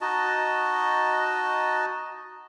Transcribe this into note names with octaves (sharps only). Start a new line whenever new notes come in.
D#4 F#4 D#5 A5